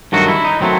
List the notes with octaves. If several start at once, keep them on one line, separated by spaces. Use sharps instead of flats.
G2 D#3 F#3 A3 F#4
E4
D#4
D#3 F#3 A3 C4